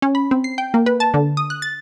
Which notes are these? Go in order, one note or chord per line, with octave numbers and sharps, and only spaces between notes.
C#4
B5
C4
C7
G5
A#3
B4
A5
D3
D#6
F#6
A6